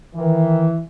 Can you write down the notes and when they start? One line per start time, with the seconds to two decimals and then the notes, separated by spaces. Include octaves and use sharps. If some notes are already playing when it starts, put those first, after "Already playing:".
0.15 D#3 E3